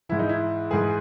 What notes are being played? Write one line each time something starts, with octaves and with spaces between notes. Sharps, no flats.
G#2 E3 E4
D#4
E4
G#2 E3 G#4